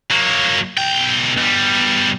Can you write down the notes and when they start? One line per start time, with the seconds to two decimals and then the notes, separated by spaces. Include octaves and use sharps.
0.11 F#3 A#3
0.77 B1 G5
1.38 B2 G3